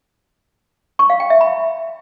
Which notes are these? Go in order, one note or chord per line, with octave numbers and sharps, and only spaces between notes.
C#6
F5
G5
E5
B5